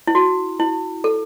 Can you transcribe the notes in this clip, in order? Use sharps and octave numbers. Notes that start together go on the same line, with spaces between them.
E4
F#4
E4
A4